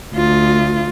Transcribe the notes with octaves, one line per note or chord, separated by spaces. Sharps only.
D2 F4